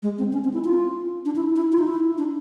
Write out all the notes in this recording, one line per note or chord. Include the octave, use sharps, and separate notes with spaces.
G#3
C4
C#4
C4
E4
F4
D4
E4
E4
F4
D#4
E4
D4